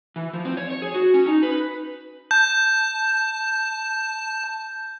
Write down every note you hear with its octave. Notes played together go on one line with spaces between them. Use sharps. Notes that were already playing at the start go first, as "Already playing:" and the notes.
E3
F3
C4
C#5
C#5
G#4
F#4
C#4
D#4
B4
A5 G6